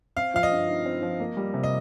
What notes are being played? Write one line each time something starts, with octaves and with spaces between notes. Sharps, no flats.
C4 F5
F3 F5
D#5
G2
D#4
C4
F3
A#3
G3
C3
D#5